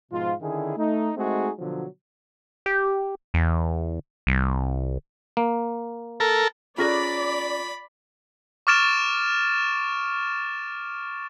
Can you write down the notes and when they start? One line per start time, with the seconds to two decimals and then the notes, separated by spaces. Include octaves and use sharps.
0.12 G#2 B2 F3 F4
0.41 D3 D#3 C#4 E4 G#4
0.77 A3 D#4
1.16 G#3 A3 C4 D#4 F#4 G#4
1.59 B2 D3 F3 F#3
2.66 G4
3.34 E2
4.27 C2
5.37 A#3
6.20 A4 A#4
6.78 C#4 F4 G#4 B4 D5 A#5 B5 A#6
8.67 C#6 D6 F6 A6 D7 E7